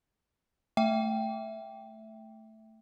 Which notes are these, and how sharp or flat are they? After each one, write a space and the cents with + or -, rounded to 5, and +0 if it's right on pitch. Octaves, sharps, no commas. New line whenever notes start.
A3 +0 E5 +0 G5 +0